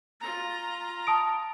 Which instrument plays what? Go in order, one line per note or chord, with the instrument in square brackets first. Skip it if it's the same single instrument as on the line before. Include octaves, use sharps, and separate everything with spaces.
[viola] F4 A#5
[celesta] A5 D#6 D7